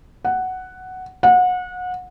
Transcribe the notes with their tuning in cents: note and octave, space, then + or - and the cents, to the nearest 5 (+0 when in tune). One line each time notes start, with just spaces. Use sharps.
F#5 +5
F#5 -30